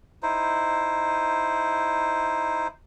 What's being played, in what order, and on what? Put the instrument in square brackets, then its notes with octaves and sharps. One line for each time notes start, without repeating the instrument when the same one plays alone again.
[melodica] D#4 E4 C5